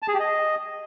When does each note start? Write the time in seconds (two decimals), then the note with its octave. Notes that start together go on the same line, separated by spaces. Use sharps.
0.02 A5
0.08 G#4
0.14 G4
0.20 D#5